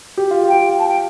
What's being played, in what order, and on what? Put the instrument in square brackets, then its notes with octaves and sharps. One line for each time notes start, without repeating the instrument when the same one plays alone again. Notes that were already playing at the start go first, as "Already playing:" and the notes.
[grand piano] G4
F4
[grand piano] G4 [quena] G5
[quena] A5
G5